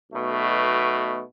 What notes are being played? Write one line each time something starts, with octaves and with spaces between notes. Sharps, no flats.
B1 B2 A3